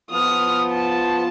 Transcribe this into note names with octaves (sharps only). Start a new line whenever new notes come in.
F3 B3 F4 D#6 F6
A5